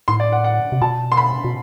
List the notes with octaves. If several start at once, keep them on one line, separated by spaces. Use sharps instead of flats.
A2 C6
D5
F#5
F#5
C3
B2 A5
C6
B5
B2